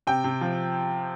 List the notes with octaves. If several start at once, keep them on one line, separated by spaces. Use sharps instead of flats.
C3 G5
C3
F3